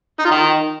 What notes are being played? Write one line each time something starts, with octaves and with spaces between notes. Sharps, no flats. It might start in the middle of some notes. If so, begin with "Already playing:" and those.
D#4
F4
D#3